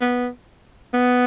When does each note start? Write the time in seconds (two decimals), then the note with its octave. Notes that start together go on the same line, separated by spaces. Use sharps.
0.01 B3
0.94 B3